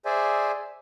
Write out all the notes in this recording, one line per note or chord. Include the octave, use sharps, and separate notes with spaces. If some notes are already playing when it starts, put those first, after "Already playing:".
G#4 C5 D5 E5 G#5